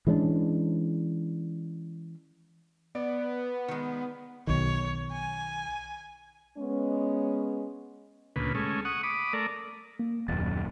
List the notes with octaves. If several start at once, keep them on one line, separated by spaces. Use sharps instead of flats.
E3 G#3 C#4 D4
B3 D5
D#3 G#3
B1 D#3 C#5
G#5
G#3 B3 C#4
D2 A#2 C#3 B4
G#3 A3 C#4
F#5 C#6 D#6
B5 D6 D#6
A3 A#4 D5
A#3
D#1 F#2 A6